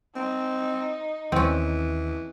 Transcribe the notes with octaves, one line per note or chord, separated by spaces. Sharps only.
C4 D#4
D#2 E3 C4 C#4